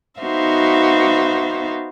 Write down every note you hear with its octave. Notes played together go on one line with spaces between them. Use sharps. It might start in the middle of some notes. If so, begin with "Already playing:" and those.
B3 D#4 F#4 C5 E5 F5